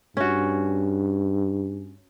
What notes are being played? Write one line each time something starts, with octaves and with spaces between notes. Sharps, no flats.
G2 C#4 F#4